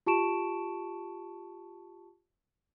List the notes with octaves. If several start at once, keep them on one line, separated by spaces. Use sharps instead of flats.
F4 G4 A5 C#6 D7 E7